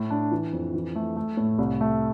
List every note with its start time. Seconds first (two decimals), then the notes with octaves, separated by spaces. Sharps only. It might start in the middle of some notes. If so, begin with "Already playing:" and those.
Already playing: A2
0.10 D4
0.32 E3
0.53 F2
0.74 E3
0.96 A3
1.16 A3
1.37 A2
1.58 C2
1.81 A3